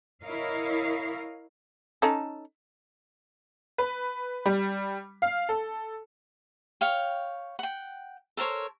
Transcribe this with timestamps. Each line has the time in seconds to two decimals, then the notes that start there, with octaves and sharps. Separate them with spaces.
0.25 E4 A#4 C#5 D#5 F5
2.02 C#4 D#4 A4
3.78 B4
4.46 G3
5.22 F5
5.49 A4
6.81 C#5 F5 G5
7.59 F#5 G5
8.37 A4 A#4 C5 C#5